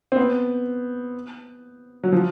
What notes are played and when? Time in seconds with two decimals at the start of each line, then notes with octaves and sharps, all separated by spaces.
0.12 C4
0.17 B3
2.04 F#3
2.12 F3